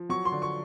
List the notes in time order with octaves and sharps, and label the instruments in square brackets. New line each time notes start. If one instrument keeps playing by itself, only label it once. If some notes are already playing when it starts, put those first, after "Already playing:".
Already playing: [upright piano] F3
F#3 C#6
C6
D3
C#6